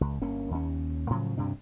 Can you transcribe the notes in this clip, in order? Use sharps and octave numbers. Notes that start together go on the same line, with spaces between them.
C#2
G1 A#3 C#4
D#2 C#4
A2 C#3 F3 F#3
D2 G2 C3 D4